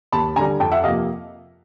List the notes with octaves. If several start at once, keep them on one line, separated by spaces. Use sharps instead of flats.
D#2 A5 B5
D3 G3 G#5 A#5
F2 G5 A5
E5 F#5
C3 F3 A#3 D#5 F5